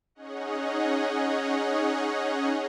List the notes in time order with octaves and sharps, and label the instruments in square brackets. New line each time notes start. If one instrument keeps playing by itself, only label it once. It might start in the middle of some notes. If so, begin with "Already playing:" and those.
[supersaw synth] C#4 D#4 G#4 C#5 D#5 F#5